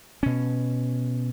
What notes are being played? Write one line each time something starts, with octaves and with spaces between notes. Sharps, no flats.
B2 C#4